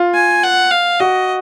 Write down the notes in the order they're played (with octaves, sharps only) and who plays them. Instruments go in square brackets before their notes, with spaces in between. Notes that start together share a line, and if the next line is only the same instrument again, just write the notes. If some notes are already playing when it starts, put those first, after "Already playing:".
Already playing: [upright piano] F4
[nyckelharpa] G#5
F#5
F5
[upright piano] F#4 [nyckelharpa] D#5